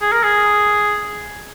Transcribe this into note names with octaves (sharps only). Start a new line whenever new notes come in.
G#4
A#4
G#4